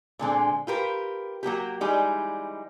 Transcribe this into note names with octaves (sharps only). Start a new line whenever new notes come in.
A#2 D3 G#3 C4
F4 G4 A#4 B4
F#3 A#3 F#4 G4
E3 G3 G#3 D#4